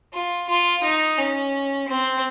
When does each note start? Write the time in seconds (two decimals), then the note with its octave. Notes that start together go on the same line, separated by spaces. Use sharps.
0.13 F4
0.49 F4
0.83 D#4
1.18 C#4
1.88 C4